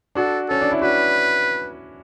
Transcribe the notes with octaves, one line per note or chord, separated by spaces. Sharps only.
D4 F#4 A4
C#4 A4
D4
E4
D4 F#4 B4